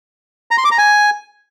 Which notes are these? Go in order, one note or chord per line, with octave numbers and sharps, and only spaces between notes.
A#5
C6
D6
A#5
G#5